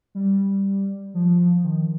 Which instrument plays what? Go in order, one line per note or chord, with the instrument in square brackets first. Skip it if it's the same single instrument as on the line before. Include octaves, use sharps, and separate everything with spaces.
[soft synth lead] G3
F3
D#3